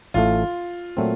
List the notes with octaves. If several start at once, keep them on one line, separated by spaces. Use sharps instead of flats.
A1 A2 A3 F4
A#2 F#3 A3 C4